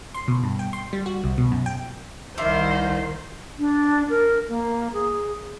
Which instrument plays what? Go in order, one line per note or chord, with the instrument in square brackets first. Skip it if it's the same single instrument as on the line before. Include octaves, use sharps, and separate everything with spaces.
[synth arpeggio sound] C6
B2
G2
G5
C6
G3
F#4
C2
B2
F#2
G5
[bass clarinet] C2 [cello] D#3 C5 [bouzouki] E4 F4 D5
[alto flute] D4
A#4
A#3
G#4